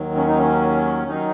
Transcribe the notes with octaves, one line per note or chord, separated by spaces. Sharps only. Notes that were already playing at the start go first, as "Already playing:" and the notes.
Already playing: D#2 D#3 F#3
C#4
D#4
C#4
D#3 F#3 D#4